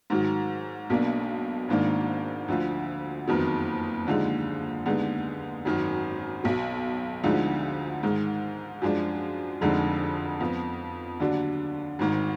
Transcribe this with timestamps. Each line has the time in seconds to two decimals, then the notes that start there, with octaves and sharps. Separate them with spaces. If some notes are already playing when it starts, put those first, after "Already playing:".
0.10 G#2 D#3 F#3
0.90 B1 B2 A#3 D4
1.69 G#1 G#2 D#3 A#3 D4
2.48 D2 D3 F3
3.28 F#1 F2 D#3 F#3 B3
4.07 D#2 D3 F3 G#3 D#4
4.86 D#2 D3 G#3 B3 D#4
5.65 G#1 F#2 D#3 F#3
6.44 B1 B2 F#3
7.24 D2 D3 F3 G#3 D#4
8.03 G#2 D#3 G#3
8.82 F#2 F3 G#3 D4
9.61 F1 F2 D3 G#3 D#4
10.40 F2 F3 B3
11.20 D#2 D3 F#3 D4
11.99 G#1 G#2 D#3